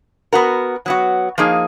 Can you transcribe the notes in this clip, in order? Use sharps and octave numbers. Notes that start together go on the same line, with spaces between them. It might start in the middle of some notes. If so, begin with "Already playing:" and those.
B3 F#4 A#4
F#3 B3 F#4
F3 A#3 D#4 G#4